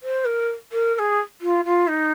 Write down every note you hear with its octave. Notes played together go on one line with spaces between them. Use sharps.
C5
A#4
A#4
A#4
G#4
F4
F4
D#4